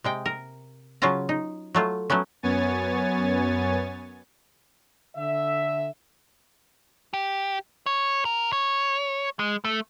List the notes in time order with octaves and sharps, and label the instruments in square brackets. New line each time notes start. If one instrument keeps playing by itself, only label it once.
[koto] C3 G#3 G5
A#4
C#3 F#3 C#4 F4 F5 A#5
D#4
F#3 A3 F4
F#3 A3 B3 C#4
[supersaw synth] F#2 B3 C#5 G#5 A6
[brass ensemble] D3 E5
[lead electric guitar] G4
C#5
A#4
C#5
G#3
A3